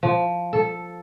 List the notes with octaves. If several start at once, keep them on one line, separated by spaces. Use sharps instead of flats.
F3
A4